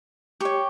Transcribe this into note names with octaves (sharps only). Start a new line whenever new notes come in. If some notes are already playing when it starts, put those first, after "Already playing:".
G4 C#5 C#6